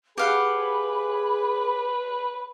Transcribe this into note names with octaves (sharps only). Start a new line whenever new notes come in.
G4 G#4 B4 F5 F#5 B5